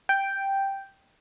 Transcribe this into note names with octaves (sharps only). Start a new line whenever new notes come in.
G5